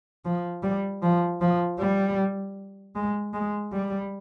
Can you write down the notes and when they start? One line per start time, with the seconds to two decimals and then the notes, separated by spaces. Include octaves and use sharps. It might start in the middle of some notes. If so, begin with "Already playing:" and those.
0.25 F3
0.63 G3
1.02 F3
1.41 F3
1.79 G3
2.95 G#3
3.34 G#3
3.72 G3